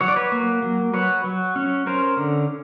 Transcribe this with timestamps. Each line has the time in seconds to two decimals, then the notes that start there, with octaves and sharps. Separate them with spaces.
0.01 F#3 C#5
0.08 D5
0.16 B4 C#5
0.32 A#3
0.62 F#3
0.94 F#3 B4 C#5
1.24 F#3
1.56 C#4
1.86 C#4 A#4 C5
2.17 D3